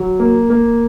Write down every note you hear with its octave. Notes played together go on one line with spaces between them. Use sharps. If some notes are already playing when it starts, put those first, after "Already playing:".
Already playing: F#3
A#3
A#3